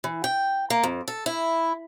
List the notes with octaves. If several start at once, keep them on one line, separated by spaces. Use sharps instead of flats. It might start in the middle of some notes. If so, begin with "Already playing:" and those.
E3
G5
A#3
F2
A4
E4